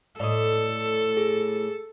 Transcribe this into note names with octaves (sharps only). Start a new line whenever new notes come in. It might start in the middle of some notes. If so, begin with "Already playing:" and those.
A2 A4 D5 D#5
G#4